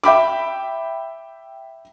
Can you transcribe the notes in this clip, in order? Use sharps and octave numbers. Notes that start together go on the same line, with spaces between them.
E5 G5 B5 D6